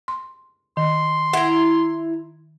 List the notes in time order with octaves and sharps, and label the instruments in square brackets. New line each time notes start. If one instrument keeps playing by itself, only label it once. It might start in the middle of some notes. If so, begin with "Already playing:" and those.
[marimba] C6
[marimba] D#3 [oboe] C6
[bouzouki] E4 A#5 [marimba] F#5